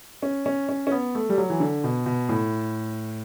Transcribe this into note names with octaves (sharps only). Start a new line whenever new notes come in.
C#4
C#4
C#4
C#4
B3
A3
G3
F#3
E3
D3
B2
B2
A2